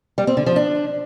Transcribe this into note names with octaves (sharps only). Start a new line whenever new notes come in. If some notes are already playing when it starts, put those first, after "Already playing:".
G3
C4
D3
F3
D4